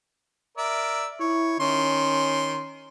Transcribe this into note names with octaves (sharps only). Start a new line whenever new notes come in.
A#4 D5 E5
E4 C#5
D#3 C#4 C6